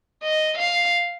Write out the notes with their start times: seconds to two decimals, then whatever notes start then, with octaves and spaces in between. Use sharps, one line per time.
0.23 D#5
0.58 F5